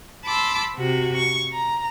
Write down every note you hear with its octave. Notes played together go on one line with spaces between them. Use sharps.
A5 B5 C6 D6 E6
C3 F#4
C#6
A#5